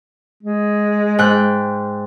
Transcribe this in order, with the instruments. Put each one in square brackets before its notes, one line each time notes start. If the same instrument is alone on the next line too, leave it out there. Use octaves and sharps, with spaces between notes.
[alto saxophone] G#3
[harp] G#2 G5 F#6